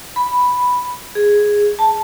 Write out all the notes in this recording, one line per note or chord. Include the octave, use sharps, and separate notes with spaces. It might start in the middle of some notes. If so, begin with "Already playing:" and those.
B5
G#4
A5